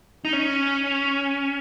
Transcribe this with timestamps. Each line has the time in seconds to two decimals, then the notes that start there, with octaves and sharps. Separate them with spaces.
0.25 D#4
0.33 C#4